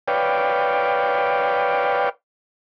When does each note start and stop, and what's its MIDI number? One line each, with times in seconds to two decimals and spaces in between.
0.08 2.09 71
0.08 2.09 73
0.08 2.09 74
0.08 2.09 77
0.08 2.09 79